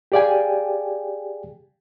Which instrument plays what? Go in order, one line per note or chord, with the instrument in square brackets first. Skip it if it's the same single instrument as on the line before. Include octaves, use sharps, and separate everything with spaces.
[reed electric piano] G4 G#4 D5 F5 G5 G#5